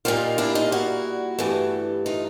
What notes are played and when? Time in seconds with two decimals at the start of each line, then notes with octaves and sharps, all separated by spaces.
0.05 A#2 G3 A#3 D#4 F4
0.38 D4 E4
0.55 D#4 F4
0.72 E4 F#4
1.39 G2 E3 A3
2.06 D#4 F4